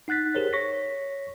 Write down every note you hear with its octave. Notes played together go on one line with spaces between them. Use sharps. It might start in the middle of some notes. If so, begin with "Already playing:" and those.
D#4 F#5 F#6 A6 B6
G4 G#4 A#4 C5 C#5
C#5 C#6 A#6 B6